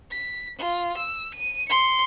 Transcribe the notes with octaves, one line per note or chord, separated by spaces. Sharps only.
B6
F4
E6
D#7
C6 C#7